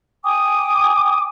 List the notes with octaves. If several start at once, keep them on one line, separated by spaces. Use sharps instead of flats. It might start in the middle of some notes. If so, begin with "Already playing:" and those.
G5 G#5 D6 D#6